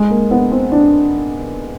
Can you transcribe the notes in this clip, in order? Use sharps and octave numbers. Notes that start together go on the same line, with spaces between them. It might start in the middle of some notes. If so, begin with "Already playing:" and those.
Already playing: G#3
A#3
B3
C4
D4